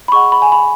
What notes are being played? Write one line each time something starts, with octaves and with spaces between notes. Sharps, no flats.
B5
G#4 D#5 F#5 C#6
B5
G#5
B5